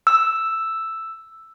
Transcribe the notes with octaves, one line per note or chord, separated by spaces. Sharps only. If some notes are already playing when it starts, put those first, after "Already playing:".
E6